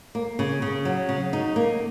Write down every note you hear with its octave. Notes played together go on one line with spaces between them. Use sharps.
A#3
C#3
C#3
F#3
C#3
D#4
A#3